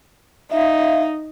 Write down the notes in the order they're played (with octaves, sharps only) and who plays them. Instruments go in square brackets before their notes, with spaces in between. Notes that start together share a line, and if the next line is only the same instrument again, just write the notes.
[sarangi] D#4 [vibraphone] E5 F5